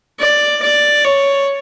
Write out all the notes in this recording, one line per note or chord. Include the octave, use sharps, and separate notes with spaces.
D5
D5
C#5